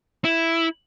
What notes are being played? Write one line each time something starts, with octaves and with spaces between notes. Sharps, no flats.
E4